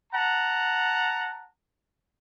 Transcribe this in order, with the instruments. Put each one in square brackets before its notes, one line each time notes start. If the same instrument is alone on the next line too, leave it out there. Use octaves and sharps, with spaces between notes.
[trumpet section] F#5 A5 A#5